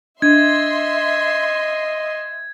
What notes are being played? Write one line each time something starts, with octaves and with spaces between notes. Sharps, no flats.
D4 D#5 E5 C6 G#6